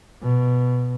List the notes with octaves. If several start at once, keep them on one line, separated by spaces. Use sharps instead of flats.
B2